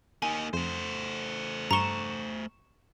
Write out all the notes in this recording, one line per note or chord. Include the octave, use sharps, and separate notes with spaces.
A#3 D#4 G#5
F2 A3 C5
G2 A#5 C#6 E7 G7